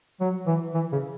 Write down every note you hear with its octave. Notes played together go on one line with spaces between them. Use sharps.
F#3
E3
E3
C#3